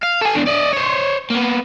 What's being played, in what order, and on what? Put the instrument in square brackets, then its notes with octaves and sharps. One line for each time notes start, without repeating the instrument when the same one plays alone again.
[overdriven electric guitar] F5
A4 G#5
E2 D4
D5 D#5
C5 C#5
A#3 B3